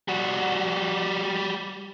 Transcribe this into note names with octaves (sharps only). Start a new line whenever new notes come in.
G3 F#4